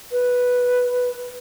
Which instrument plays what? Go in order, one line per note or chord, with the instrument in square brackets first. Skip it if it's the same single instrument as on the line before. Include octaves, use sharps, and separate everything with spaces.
[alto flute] B4